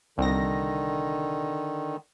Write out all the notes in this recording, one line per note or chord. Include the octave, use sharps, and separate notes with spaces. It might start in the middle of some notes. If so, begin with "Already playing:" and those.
C2 D3 D#3 A#6